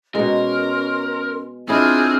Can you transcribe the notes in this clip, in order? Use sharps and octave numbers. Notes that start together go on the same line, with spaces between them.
B2 G#3 C#4 A#4 C6
C4 D4 E4 F4 G#4 D#5 F6 G#6